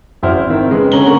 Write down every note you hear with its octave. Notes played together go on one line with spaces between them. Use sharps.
G#1 F#2 E4 C5 F6
C5
D#3 C4 E4
C#3 G#3 B4
D3 C#4 A#5 F#7 G7
D3 A#3 A#5 C#6